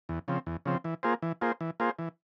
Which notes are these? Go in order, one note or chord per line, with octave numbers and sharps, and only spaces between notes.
E2
C#3 F3 C4
E2
C#3 F3 C4
E3
A#3 F4 G#4 C5
E3
A#3 F4 G#4 C5
E3
A#3 F4 G#4 C5
E3